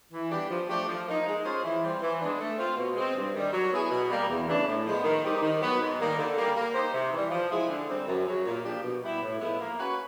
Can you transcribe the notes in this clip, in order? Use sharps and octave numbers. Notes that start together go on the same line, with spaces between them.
E3
G3 B3 D4 G4
F3
A3 D4 G4
F3
A#3 D#4
G#3
C#4 F4 G#4 C5
E3
G3 C4 F4
E3
G#3 B3 D4
A3
C4 F4
B2
G#3 C4
G2
D#3 G3
F#3
B3 E4 G#4
B2
G3 A#3
E2
C#3 E3 A3 D4
A2
F3 G#3 B3
D#3
G3 C4 D#4 G4
D#3
F#3 B3
G#2
D#3 G3 A#3
D3
G3 A#3
A#3
D#4 G4 C5
C3
E3 G3
F3
G#3 C4 E4 G#4
D3
G3 C4
F#2
C#3 F#3
A#2
F3 A#3 D4 G4
B2
G3 B3 E4
A2
F3 G#3 B3 E4
A#3
C#4 F#4 B4